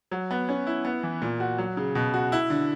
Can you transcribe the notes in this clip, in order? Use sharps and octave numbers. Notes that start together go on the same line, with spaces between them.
F#3
B3
C#4
E4
B3
E3
A#2
F#4
F#3
C#3
B2
F#4
E4
D3